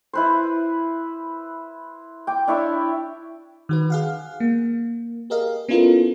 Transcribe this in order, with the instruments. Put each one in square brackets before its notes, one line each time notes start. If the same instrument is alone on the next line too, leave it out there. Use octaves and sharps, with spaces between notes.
[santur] E4 B4 C5
G5 D6
D4 E4 C#5 E5
[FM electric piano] D#3 F#4 B4
G#4 F5 F#5
A#3
G4 G#4 A#4 D#5 F5
B3 C#4 E4 F4 A4 A#4